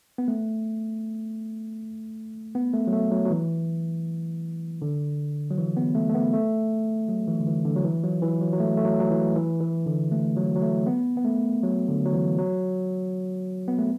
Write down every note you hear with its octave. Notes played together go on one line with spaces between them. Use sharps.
B3
A3
B3
A3
F#3
A3
F#3
F#3
E3
D3
F#3
E3
B3
A3
A3
B3
A3
F#3
E3
D3
E3
D3
F#3
E3
F#3
E3
F#3
F#3
A3
A3
F#3
F#3
E3
E3
E3
D3
A3
F#3
F#3
A3
B3
B3
A3
F#3
D3
F#3
E3
F#3
B3
A3